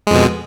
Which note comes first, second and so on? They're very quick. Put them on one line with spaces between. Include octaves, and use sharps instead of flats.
G#3 F2 B2